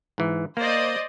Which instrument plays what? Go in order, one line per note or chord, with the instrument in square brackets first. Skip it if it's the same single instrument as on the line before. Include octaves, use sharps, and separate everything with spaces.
[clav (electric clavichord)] G#2 E3
[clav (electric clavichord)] A#3 [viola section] C5 D5 D#5